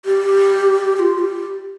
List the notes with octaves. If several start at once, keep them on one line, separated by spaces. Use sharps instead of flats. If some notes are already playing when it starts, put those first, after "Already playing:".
G4
G4
F4
G4